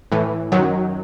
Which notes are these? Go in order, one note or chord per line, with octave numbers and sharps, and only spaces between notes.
A2 E3
F#2 D#3 F#3